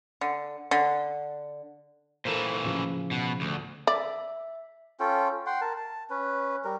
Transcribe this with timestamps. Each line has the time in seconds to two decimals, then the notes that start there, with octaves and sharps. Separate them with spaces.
0.21 D3
0.71 D3
2.25 A#2 E3 A4 A#4 C5
2.64 A2 C#3 F3
3.11 B2
3.41 D2
3.87 D5 E5
5.00 C#4 F4 A4 G5
5.46 F#5 G5 C6
5.61 A#4 A5
5.76 A5
6.10 C#4 B4
6.65 G3 A#4